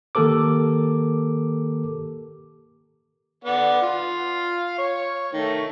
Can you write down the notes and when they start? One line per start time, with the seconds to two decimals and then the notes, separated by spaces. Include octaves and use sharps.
0.15 D#3 A#3 G4 A4 A#4 D6
3.45 B3 D5 F#5
3.82 F4 F5
4.78 C#5
5.33 D#3 A3